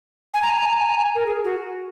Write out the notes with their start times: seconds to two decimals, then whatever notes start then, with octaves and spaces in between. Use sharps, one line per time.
0.34 G#5
0.42 A#5
0.50 G#5
0.58 A#5
0.65 G#5
0.73 A#5
0.81 G#5
0.89 A#5
0.97 G#5
1.15 A#4
1.26 G#4
1.44 F#4